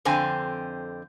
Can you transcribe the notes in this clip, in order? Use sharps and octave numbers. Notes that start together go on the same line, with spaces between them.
F2 D3 C4 G#5